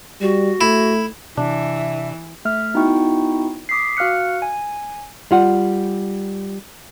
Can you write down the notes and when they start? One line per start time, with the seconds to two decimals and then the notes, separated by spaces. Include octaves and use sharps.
0.21 G3 F#4
0.61 A3 E4
1.37 C3 E3 D4 E5
2.45 A3 E5 F6
2.74 B3 D#4 E4 F#4 G5 C#6
3.69 D6 D#6 B6 C7
3.97 F#4 F5 F6 F#6 C#7
4.42 G#5
5.31 G3 F4 F#5